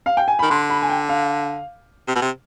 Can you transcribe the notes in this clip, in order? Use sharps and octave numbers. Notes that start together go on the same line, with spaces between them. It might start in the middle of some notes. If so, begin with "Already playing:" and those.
F5
G5
G#5
D#3 B5
D3 C6
B5
G#5
G5
F5
C3
B2
C3